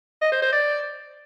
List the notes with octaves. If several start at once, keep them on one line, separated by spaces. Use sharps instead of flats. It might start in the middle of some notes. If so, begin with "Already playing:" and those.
D#5
C5
C5
D5